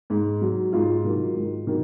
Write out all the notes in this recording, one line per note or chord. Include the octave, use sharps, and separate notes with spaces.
G#2
F#3
G#2 F4
D#3 F#3
G#2
D#3 F#3